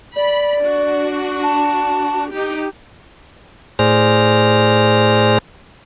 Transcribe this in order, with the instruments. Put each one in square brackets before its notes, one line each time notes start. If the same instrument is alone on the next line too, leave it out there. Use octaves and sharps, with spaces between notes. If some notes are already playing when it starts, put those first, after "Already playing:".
[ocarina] D5 [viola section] B5
[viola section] D4 F#4
[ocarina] A5
[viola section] D#4 G4
[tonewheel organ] A2 G#4 C5 D5 F6 A#6